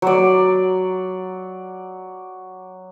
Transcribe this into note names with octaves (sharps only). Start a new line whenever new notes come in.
F#3 D5